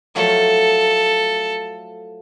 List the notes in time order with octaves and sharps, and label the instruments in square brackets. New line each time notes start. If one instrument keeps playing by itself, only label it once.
[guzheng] F3 F#3 A3 [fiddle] A4